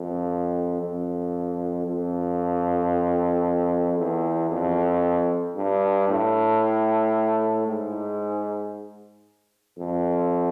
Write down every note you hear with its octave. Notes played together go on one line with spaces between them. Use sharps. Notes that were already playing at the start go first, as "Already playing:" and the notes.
Already playing: F2
F2
F2
E2
F2
G2
A2
G#2
F2